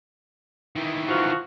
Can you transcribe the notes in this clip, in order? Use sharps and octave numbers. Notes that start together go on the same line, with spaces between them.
D#3 E3
F3 F#4